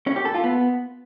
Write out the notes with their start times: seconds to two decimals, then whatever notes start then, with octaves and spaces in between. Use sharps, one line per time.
0.07 C#4
0.16 G4
0.25 A4
0.34 F4
0.44 B3